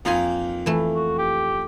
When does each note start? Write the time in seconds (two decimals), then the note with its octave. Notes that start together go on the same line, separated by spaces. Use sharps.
0.05 F2 A#3 D#4 F4 G#5
0.66 E3 A3
0.95 F#4
1.18 G4